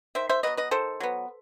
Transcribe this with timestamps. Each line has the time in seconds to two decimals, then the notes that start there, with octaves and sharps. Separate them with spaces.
0.15 D#3 C5 E5
0.29 C5 E5
0.43 F#3 B3 B4 D#5
0.57 B4 D#5
0.71 D#3 A4 C5
1.00 F#3 B3